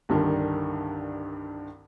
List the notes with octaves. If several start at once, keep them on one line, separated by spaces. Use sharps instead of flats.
C2 G2 D3 D#3